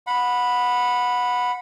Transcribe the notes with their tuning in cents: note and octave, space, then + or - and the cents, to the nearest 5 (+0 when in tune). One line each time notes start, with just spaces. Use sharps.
F#5 -25 B5 -5